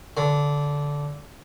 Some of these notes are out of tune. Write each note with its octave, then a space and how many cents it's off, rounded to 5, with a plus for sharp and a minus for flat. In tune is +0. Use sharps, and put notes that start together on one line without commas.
D3 -15